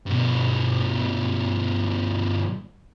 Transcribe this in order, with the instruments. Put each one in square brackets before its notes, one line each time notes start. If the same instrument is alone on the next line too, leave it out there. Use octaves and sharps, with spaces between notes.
[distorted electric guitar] G2 B2